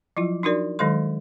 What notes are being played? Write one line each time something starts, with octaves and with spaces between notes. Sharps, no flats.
F3 F#3 E4 F4
D4 D#4 F#4 A#4 D5
D#3 F#3 G#3 A4 C6